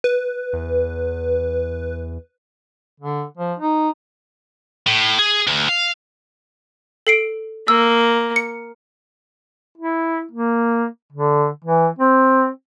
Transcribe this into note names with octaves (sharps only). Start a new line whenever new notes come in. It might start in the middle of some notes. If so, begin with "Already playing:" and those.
B4
E2
D3
F3
D#4
A2
G#4
D2
F5
A4 C7 D7
A#3 E6
C#7
E4
A#3
D3
E3
C4